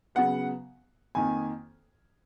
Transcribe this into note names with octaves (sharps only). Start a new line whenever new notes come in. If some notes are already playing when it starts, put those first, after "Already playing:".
C#3 F#3 B3 F#5
F2 D#3 A#3 G#5